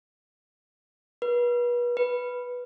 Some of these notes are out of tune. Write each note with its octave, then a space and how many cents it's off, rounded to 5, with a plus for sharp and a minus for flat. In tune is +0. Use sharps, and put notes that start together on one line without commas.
B4 -35
B4 -5